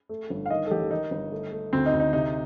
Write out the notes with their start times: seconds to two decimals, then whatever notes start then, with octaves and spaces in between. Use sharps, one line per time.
0.09 A3
0.30 G1
0.46 F5
0.50 D#3 D#5
0.67 A4
0.71 A1 G4
0.91 D#3 D#4
1.11 G1
1.32 A3
1.52 A3
1.73 D2 C4
1.86 D#4
1.93 D2
2.00 D#4
2.13 C3 D#4